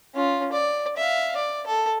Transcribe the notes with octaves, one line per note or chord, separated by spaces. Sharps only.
C#4 F4
D5
E5 F5
D5
A4